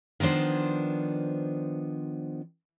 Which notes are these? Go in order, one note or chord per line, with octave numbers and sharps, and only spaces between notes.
D#3 F3 B3 D4 C5